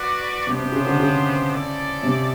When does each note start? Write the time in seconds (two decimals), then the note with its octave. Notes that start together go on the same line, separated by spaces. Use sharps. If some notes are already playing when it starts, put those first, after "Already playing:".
Already playing: F#4 B4 D5 F#5
0.47 C3 B3 D4 G4 C5
0.60 C3
0.72 C#3
0.86 D3
0.99 C#3
1.52 C4 E4 A4 D5
2.03 C3